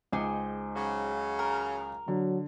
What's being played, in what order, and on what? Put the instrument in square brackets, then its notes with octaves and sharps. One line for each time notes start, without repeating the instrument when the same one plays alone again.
[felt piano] C#2 D6 [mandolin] D#4 G#4 C5
[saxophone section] C#3 F#3
[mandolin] A#4
[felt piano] D3 [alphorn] F#3